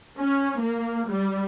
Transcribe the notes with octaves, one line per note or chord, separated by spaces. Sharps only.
C#4
A#3
G3